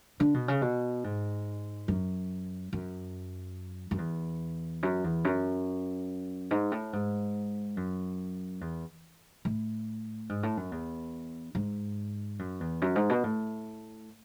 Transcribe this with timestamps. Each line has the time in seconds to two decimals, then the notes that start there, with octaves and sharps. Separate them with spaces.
0.20 D3
0.34 B2
0.48 C#3
0.62 B2
1.04 G#2
1.88 F#2
2.73 F#2
3.91 F#2
3.98 E2
4.83 F#2
5.04 E2
5.25 F#2
6.51 G#2
6.72 A2
6.93 G#2
7.77 F#2
8.61 E2
9.45 A2
10.29 G#2
10.43 A2
10.57 F#2
10.71 E2
11.55 G#2
12.39 F#2
12.60 E2
12.82 F#2
12.96 G#2
13.10 B2
13.24 A2